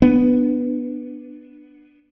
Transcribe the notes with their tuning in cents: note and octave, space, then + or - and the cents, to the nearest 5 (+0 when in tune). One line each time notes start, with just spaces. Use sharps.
B3 +0 D4 +15